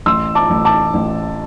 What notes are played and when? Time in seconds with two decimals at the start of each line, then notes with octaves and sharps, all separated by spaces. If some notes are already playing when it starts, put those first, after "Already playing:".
0.06 A1 C6 E6
0.35 A5 D6
0.50 A1
0.65 A5 D6
0.94 A1